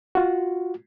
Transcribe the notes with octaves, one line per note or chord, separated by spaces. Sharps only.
F4 F#4